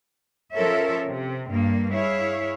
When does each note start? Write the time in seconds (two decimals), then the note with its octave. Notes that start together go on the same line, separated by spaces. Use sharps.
0.53 F3 C#4 A4 A#4 C#5 E5
1.07 C3
1.50 G2 A#3
1.93 E4 G#4 C#5 E5 F5